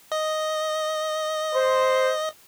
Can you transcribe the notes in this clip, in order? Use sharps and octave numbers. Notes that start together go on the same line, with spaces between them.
D#5
C5